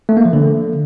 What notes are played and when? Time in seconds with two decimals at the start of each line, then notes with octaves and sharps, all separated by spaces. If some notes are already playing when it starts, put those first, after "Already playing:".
0.09 A3
0.17 A#3
0.25 F3
0.33 D3